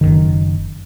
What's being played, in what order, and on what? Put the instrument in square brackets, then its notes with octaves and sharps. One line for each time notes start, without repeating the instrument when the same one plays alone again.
[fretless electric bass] F#1 C2 D#3